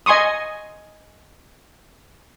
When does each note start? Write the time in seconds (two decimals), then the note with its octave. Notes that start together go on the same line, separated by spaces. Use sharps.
0.06 D#5 G#5 C6 C#6 D#6